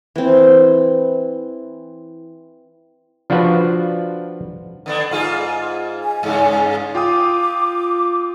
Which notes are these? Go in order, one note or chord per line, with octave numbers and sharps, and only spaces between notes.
E3 C4
F3 D4 F4 F#4 B4
D3 B3 D4
G#2 F4 G#4
G#5
G2 C#3
F4 G5 D6 D#6